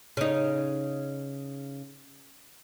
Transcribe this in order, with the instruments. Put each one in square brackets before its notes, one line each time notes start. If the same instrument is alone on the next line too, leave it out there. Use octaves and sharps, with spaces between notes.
[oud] C#3 D#4